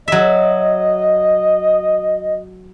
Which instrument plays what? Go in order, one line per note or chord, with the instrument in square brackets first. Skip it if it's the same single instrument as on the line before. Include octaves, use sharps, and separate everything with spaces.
[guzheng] F#3 E5 [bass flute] D#5